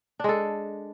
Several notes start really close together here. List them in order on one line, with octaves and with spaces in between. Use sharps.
D4 G#3 A4